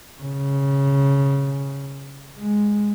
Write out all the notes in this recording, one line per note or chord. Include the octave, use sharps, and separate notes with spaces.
C#3
G#3